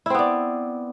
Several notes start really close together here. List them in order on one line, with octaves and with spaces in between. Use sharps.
E4 C4 B3 D5